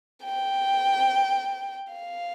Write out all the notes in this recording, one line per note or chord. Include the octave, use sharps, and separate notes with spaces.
G5
F5